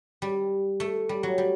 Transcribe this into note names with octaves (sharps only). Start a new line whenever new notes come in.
G3
A3
G3
F#3
G3